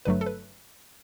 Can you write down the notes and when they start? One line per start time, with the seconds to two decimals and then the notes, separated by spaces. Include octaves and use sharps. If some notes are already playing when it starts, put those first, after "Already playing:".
0.05 G1 G2 F#3 A3 B4
0.21 A4
0.26 B4